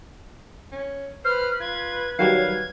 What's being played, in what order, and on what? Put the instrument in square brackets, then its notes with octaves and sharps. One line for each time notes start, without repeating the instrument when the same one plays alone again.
[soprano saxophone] C#4
[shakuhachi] B4 [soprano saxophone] C5 [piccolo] F6
[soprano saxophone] F4 [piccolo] G#6
[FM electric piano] D#3 F#3 G3 [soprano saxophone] F5 [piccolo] G#6